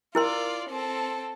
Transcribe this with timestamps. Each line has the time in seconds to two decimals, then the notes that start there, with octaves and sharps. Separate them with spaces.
0.15 E4 F4 A#4 D5 C6
0.69 C4 A4